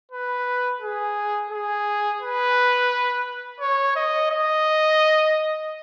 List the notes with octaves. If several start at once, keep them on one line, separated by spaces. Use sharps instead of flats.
B4
G#4
G#4
B4
C#5
D#5
D#5